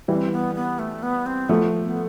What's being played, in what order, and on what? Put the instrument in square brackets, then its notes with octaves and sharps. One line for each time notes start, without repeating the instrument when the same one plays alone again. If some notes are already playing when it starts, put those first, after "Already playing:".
[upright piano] E3 G3 [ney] C4
[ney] B3
B3
A3
B3
C4
[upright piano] F3 A3 [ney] B3
[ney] B3